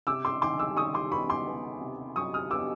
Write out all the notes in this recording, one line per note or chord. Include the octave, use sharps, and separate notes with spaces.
C3 D6 E6
C6 D6
D#3 C6 D6
D6 E6
D#3 C#6 D#6
C6 D6
B3 B5 C#6
C6 D6
B3
C3
F#3 C#6 D#6
D#6 F6
B3 D6 E6